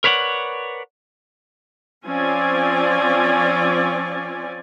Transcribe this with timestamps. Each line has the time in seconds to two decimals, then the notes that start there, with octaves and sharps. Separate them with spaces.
0.04 A#4 B4 C#5 D5 F#5
2.06 F3 C4 C#4 D5 G#5